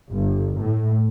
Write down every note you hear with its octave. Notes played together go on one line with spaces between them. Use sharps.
G1
A2